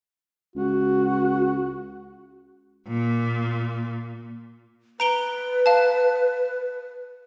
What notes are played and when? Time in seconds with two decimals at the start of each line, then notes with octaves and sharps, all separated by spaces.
0.56 C#2 F#4
2.88 A#2
5.00 B4 A#5 D7 G7
5.66 F5 A5